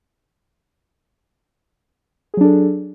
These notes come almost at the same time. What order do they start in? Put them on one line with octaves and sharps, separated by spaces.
G#4 F#3 D4 A4